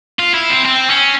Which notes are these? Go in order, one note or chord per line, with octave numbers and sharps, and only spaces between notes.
F4
E4
C4
C4
C#4